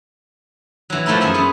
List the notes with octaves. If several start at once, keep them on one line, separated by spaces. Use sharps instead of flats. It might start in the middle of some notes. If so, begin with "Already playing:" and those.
E3 F#3
F3 A3 A#3 D#4 E4
F#2 G#4 E5 A#5
B3 C#4 F4